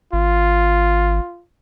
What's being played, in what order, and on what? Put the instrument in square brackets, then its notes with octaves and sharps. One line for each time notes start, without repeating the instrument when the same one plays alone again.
[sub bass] G#1 [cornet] F4